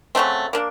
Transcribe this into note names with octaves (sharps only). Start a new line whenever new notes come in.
C#3 F#3 A3 C4
A#3 D4